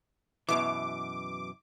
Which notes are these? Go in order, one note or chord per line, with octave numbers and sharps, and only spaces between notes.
F#2 B2 E3 D6